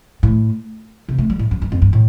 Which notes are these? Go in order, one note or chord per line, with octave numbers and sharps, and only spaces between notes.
A2
C3
A3
G3
A2
G2
G2
F2
G2
A2